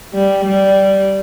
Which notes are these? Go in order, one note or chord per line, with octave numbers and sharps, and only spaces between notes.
G3
G3